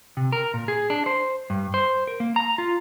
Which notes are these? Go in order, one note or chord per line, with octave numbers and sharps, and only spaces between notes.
C3
A#4
A#2
G#4
D4
C5
G2
C5
A#4
A#3
A#5
F4